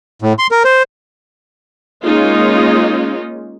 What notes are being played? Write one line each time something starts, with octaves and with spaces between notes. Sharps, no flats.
A2
C6
A#4
C5
G#3 A#3 C#4 D#4 F4